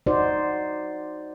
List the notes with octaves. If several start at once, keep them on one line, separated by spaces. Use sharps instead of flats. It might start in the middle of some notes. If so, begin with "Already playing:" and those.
D#4 F#4 C5 D5